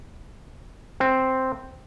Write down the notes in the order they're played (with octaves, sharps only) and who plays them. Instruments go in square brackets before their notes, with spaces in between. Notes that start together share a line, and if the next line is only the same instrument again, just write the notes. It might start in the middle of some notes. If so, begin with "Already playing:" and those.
[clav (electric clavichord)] C4